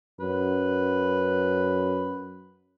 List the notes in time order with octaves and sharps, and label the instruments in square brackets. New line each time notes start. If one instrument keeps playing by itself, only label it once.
[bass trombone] F#2 [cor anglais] B4